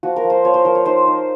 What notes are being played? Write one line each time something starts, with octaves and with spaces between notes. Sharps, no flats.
F3 F#4
A#4
F3
C5
F3 C#5
C5
F3 A#4
C#5
D#4 C5
D#4